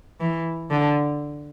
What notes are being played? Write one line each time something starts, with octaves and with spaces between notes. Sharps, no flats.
E3
D3